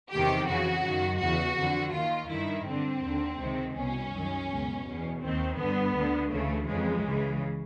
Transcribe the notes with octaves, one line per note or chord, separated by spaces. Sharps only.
E2 C3 D#3 G4
F2 C#3 E3 F#4
F#2 D#3
E2 C#3 E3 F#4
F2 D3
D#2 D#3 F4
G2 D#3 E4
G2 D3 C4
D#2 D3
C#2 C3 D#3
C2 B2 C#4
F#2 D#3
C#2 B2
E2 B2
D#2 D#3 C4
G2 D3 B3
D2 D3
D2 C#3 E3 A3
F2 C#3 E3 G#3
C#2 C#3 E3